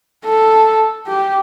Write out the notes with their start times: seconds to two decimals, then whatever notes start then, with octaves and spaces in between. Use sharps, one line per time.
0.24 A4
1.07 G4